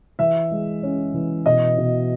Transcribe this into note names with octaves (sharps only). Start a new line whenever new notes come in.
E3 E5
G#3
C#4
E3
B2 D#5
B2